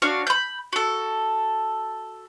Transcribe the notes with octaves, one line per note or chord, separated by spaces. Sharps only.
D4 F#4 C#5 F5
B5 G6
F#4 A4